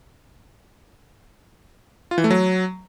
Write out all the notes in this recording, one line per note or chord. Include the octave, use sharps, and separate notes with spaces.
F4
E3
A3
F#3